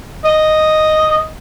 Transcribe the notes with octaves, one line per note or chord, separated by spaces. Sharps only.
D#5